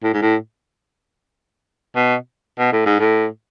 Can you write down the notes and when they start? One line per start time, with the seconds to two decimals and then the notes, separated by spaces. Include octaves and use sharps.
0.03 A2
0.14 G#2
0.22 A2
1.96 B2
2.59 B2
2.72 A2
2.86 G#2
3.00 A2